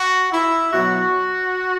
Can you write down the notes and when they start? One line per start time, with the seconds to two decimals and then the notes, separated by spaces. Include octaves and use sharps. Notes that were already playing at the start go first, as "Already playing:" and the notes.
Already playing: F#4
0.32 E4
0.71 B2 F#3 F#4